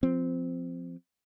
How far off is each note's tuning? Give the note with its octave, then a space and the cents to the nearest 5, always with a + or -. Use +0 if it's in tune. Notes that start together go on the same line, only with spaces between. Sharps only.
F3 +0 C4 -15